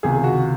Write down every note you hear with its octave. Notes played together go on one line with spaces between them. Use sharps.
C#2 C3 D#3 G#4
F#4